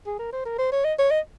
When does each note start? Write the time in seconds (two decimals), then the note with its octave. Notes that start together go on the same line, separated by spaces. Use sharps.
0.06 G#4
0.19 A#4
0.33 C5
0.45 A#4
0.58 C5
0.72 C#5
0.84 D#5
0.99 C#5
1.11 D#5